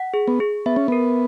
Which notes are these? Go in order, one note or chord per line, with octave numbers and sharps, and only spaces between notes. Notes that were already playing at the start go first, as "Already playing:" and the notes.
Already playing: F#5
G#4
B3
G#4
B3 E5
C#4
B3 A#4